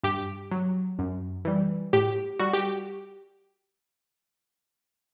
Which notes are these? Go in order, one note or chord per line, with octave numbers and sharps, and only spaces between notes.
G2 G4
F#3
F#2
E3 G3
A2 G4
G3 F#4
G4